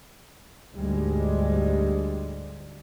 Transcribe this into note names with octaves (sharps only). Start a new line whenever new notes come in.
D2 G#2 G3 G#3